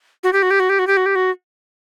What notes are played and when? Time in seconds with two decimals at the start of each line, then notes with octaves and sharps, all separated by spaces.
0.24 F#4
0.33 G4
0.43 F#4
0.51 G4
0.60 F#4
0.69 G4
0.79 F#4
0.87 G4
0.97 F#4
1.06 G4
1.15 F#4